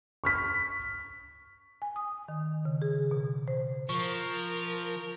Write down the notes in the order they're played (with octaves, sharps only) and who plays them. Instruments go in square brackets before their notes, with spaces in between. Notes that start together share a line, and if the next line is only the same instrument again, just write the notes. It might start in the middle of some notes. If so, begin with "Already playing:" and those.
[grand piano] C#6 F6 B6
[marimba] G#5
D#6
D#3
C#3
G#4
B2
C5
[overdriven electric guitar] F3 [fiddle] A#4 [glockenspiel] C#6